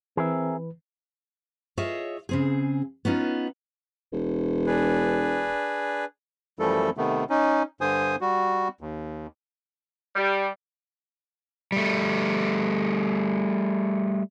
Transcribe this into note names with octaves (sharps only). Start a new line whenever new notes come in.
E3 C4 G#4 A#4 B4 E5
F4 G#4 C#5 D#5 E5
C#3 C4 G#4
B3 C#4 D#4 F4
E1
D4 G#4 B4
F#2 E3 F3 G3 A3 A4
C3 D#3 A3 B3
C#4 D#4
G2 D3 C5 G#5 D#6
G3 F#4
D#2
G3
G3 A3